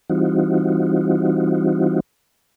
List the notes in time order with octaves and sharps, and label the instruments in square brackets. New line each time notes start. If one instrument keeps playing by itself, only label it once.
[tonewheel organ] E3 G3 C4 D#4 F4 F#4